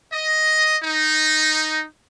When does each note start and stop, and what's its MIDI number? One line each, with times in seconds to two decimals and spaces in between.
0.13 0.77 75
0.83 1.84 63